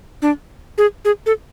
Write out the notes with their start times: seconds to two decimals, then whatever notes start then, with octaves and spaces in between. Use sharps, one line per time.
0.22 D4
0.78 G#4
1.05 G#4
1.26 A4